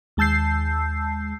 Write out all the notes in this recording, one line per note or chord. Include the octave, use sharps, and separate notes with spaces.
D#2 G#3 A5 E6 G6 C7